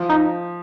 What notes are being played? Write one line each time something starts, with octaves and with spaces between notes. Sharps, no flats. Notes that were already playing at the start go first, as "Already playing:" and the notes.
Already playing: F3
D#4